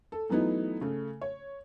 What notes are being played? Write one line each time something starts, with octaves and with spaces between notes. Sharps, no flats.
A4
E3 F#3 A3 B3 D#4 E4
C#3 A3
C#5